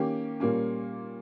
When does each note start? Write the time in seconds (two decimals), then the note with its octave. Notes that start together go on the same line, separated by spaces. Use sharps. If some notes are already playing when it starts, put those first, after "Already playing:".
Already playing: D#3 A#3 C#4 G4
0.40 A#2 G3 A#3 C#4